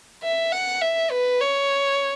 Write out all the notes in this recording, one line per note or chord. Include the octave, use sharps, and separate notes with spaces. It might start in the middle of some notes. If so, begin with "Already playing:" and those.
E5
F#5
E5
B4
C#5